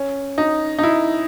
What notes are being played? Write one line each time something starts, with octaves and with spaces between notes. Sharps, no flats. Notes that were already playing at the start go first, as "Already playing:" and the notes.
Already playing: C#4
D#4
D#4
E4